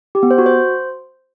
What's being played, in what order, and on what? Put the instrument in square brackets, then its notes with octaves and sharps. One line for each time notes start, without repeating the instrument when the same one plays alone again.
[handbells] G4
B3
C5
F#4
C5